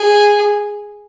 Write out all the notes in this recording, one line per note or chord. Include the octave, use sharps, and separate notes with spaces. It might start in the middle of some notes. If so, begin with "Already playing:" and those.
Already playing: G#4